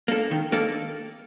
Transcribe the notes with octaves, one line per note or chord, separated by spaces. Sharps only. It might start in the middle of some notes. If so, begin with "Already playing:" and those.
A#3 D4 A4
D#3
A#3 D4 A4